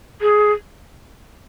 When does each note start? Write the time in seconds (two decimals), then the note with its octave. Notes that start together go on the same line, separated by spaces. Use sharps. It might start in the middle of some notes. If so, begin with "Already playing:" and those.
0.21 G#4